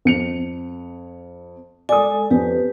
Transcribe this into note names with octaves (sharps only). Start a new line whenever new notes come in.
F2 C#7 F7
G#3 A4 D5 G#5 D#6
F2 G4 B4